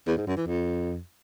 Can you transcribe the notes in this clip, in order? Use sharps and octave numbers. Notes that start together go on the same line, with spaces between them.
E2
G#2
F#2
E3
F2